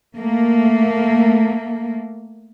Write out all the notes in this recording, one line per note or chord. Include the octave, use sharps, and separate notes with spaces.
A3 A#3